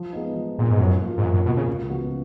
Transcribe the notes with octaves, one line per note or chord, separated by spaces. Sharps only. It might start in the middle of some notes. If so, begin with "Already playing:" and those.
Already playing: F3
G#3 B3 D#4
F3
A#2 G#3 B3 D#4
G#2
F#2 F3
A#3 F4
G#2
F#2 F3
F#2
B2 A#3 F4
C#3
C#2
C#3 F3 B3 F#4